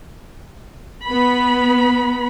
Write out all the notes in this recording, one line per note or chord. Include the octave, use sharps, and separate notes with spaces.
B3 B5